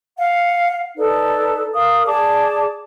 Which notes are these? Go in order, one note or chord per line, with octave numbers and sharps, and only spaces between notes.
F5 F#5
D#4 A4 B4 D5
A#4 F5 D#6
G#4 D5 A5 D6